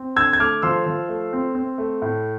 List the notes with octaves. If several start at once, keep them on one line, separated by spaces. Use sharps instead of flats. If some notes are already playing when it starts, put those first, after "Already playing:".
Already playing: C4
D3 E6 G#6
G#6
A3 D6 F6
F3 C6 E6
F3
A3
C4
C4
A3
A2